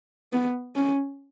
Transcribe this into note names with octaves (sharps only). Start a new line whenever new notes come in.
B3
C#4